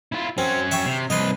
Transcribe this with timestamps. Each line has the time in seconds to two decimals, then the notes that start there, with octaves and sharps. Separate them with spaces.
0.12 E4 F4
0.38 F#3 C4 C#4
0.71 E5 G5 C#6
0.86 C3
1.10 C2 B4 D#5 C6